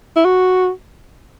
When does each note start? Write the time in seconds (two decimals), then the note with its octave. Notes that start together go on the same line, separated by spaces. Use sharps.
0.16 E4
0.25 F#4